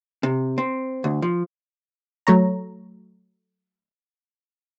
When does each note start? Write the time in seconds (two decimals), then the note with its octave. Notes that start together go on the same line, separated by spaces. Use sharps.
0.23 C3
0.58 C4
1.04 D2
1.22 F3
2.27 F#3 A3 C#5 A#5